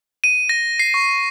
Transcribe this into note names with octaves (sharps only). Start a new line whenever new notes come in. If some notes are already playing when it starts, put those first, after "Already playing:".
D#7
A#6
C7
C#6